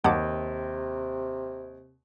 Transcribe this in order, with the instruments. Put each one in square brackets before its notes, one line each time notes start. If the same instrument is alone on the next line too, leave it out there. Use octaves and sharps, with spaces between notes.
[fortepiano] D#2 [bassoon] C3 [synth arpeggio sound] F#5 A5 D6